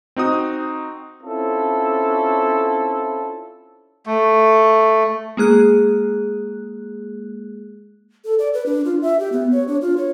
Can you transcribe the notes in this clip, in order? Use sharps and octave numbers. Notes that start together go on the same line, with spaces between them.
C4 D#4 F#4 D#6
C4 C#4 E4 F4 A4
A3
G#3 A#3 G#4 F#6
A4
D5
B4
D4
F4
E5
G4
B3
C#5
D4
F4
C#5